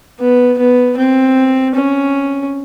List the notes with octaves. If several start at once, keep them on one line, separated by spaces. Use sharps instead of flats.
B3
B3
C4
C#4